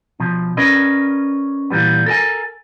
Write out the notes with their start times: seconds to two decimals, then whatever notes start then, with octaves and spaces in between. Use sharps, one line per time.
0.20 B2 F3
0.57 C#4 A#4 B4 D5 D#5
1.70 A#2 E3 G3 B3
2.06 A4 A#4 E5 G#5